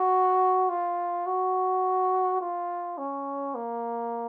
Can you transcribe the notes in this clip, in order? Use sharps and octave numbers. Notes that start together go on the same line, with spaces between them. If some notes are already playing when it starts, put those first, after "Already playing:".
Already playing: F#4
F4
F#4
F4
C#4
A#3